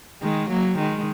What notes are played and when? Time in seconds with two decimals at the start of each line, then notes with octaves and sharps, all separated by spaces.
0.22 D#3 G#3
0.50 F#3 A#3
0.78 D#3 G#3